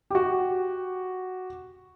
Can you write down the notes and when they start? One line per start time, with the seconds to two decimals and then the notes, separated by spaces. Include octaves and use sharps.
0.10 F#4 G4